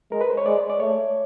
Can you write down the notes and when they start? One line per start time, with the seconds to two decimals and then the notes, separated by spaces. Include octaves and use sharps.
0.12 G#3 A#4
0.21 B4
0.30 C5
0.37 C#5
0.46 G#3 D5
0.70 D5
0.80 A3 C#5